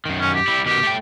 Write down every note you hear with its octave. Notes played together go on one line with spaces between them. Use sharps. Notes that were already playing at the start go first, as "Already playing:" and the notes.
F#2 D#3
C#4
G4
G3 E4
B2 D#3 G4
A3 G5